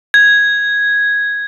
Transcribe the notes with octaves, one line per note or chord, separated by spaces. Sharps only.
G#6